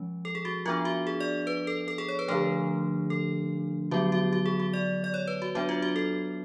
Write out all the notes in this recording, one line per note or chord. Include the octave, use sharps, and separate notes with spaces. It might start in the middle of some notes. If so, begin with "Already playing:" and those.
Already playing: F3 G#3 C#4
A4
G#4
F#4
F3 B3 D4 F4
F#4
G#4
D5
B4
A4
A4
G#4
C#5
B4
D3 F3 A3 D4 A4
A4
D3 F#3 B3 F#4
F#4
F#4
G#4
F#4
D5
D5
C#5
B4
F#4
F#3 B3 D4 F#4
F4
F#4
A4